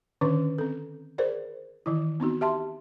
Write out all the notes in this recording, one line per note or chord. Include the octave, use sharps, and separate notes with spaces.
D3 D#3 C#4 D4 B4
C4 A4
G#4 A#4 C5 D5
D#3 E3 E4
B3 C4 D#4 F#4
G4 E5 A5 C6